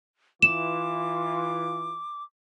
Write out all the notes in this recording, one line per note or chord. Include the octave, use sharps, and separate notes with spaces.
E3 F4 D6 E7